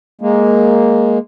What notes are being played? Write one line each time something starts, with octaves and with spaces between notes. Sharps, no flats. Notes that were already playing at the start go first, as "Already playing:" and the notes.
G#3 A#3